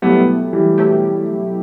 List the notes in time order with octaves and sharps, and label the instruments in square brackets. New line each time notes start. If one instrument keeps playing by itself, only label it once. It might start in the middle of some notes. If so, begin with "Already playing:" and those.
[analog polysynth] B2 F#3 A3 E4 G4 [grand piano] G3 B3
[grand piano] E3 G3
[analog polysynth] B2 F#3 A3 E4 G4